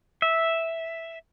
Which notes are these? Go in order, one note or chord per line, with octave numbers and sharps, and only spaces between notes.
E5